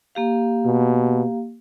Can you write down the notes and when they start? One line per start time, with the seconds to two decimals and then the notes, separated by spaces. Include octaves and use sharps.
0.15 A#3 G4 F5
0.65 B2